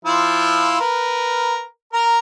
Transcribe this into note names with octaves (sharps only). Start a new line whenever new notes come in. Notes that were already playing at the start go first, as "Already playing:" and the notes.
F3 E4 F4
A#4 B4
A#4 A#5